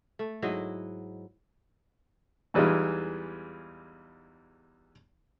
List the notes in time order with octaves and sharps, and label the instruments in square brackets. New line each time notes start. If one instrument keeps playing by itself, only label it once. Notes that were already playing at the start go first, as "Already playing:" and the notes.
[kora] A3
G#2 F#3 E4 D#5
[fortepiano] E2 E3 G3 G#3 D#4 F4